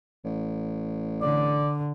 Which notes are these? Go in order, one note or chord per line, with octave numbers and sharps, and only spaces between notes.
A1
D3 D5